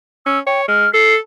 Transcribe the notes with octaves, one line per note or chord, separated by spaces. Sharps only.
C#4 E6
C#5 G5
G#3 F6
A4 C7